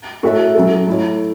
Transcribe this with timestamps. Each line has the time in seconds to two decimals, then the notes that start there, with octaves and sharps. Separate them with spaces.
0.23 A3 F#4 A4 C#5 E5
0.55 F#3 C#4 A4
0.87 A3 E4 C#5